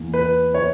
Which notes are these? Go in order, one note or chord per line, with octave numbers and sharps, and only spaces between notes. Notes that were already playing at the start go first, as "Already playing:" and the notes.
Already playing: E2 A#3
B4
C#5